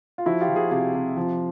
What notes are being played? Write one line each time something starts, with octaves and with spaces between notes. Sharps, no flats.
F4
F3 E4 F#4
F4 G4
F3
F#4 G#4
C3 F4 G4
C3
F3